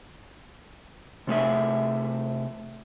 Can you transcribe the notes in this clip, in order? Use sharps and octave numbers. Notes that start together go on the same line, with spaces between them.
C3 A3 G#4 E5